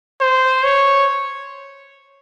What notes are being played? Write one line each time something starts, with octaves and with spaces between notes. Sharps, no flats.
C5
C#5